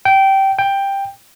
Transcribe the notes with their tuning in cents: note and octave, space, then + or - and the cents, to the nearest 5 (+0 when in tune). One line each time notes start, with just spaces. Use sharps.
G5 -15
G5 +10